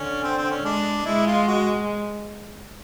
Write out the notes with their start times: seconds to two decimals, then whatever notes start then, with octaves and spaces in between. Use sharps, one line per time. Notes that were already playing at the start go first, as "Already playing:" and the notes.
Already playing: D3 C#4
0.23 C4
0.37 C4
0.51 C#4
0.65 G#3 D4
1.06 G#3 E4
1.26 F4
1.47 F#4